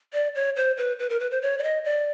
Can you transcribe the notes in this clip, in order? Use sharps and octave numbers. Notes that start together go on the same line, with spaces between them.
D5
C#5
C5
B4
B4
A#4
B4
C5
C#5
D5
D#5
D5